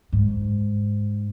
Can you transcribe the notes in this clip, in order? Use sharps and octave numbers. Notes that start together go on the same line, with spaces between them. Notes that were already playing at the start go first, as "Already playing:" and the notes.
G#2